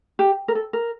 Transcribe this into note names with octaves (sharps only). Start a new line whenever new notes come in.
G4
A#4
A4
A#4